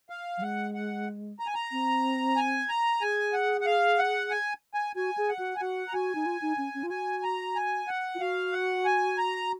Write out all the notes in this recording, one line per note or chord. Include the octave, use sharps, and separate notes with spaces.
F5
F#3
G#3 F#5
F#5
A#5
G#5
A#5
C4
G#5
A#5
G#4 G#5
F#5
F#5
F5
F#5
G#5
G#5
F#4 G#5
G#4
F#5
F#4
G#5
F#4 F#5
A#5
F#4 G#5
D#4
F4
D#4
C#4
C#4
F4
F#4 G#5
A#5
G#5
F#5
F4
F#4 F5
F#5
G#5
A#5